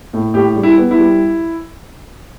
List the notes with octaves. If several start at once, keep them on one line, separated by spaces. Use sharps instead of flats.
A2
A2 G4
G3
E4
B3
E4
G3